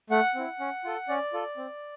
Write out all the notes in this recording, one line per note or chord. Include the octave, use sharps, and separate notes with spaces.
A3 F#5
C4 E4
C#4
F4 A4
C#4 D5
F4 A4
C4